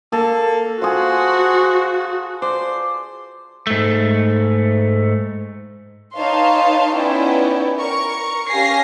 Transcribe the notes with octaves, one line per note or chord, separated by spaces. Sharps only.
A#3 A4
F4 F#4 G#4 C5
C5 D5
G#2 A3
D#4 B4 C#5 F5 A5 C6
B3 C#4 D#4 E4 D5 G5
A#4 C#6
C#4 G4 F5 G#5 A#6 C7